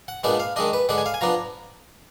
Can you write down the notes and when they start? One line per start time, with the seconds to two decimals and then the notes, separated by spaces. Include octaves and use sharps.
0.08 F#5
0.23 A#2 G#3 B3 D4 F#5
0.40 F5
0.56 D#3 G#3 D4 D#5
0.73 B4
0.89 D3 G#3 D4 F#5
0.98 G#5
1.06 F5
1.14 G#5
1.21 F3 B3 D4 A#5